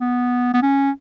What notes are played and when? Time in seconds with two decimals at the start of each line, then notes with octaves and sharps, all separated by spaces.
0.01 B3
0.54 B3
0.62 C#4